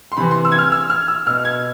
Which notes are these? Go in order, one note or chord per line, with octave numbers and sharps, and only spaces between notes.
C6
C3 E3 B5
C6
E6
G#6
F6
E6
F6
E6
B2 F6
G#6